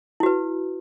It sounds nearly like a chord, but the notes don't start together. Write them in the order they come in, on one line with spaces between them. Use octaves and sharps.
E4 F#4 B4